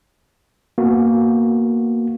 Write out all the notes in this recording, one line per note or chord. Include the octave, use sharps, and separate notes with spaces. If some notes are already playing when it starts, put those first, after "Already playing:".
A#3 B3 F#4